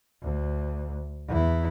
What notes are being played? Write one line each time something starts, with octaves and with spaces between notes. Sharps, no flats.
D2
E2 E4